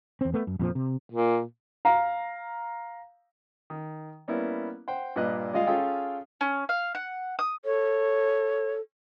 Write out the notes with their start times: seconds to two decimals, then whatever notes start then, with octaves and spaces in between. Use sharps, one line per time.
0.21 E2 C4
0.34 A3 B3
0.47 F#2
0.59 F2 A#2 F3
0.75 C3
1.10 A#2
1.85 F5 A#5
3.70 D#3
4.28 G3 A#3 B3 C#4 E4
4.88 C5 F#5 G5
5.16 G2 A#2 G3 B4 D#5 F#6
5.53 G3 G#3 F4 D#5 F5
5.67 C#4 F4 G#4 A4 F5 G5
6.41 C#4
6.69 F5
6.95 F#5
7.39 D#6
7.65 A4 C#5